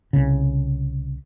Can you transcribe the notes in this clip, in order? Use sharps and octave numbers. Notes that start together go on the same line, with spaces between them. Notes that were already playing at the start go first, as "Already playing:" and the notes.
C2 C#3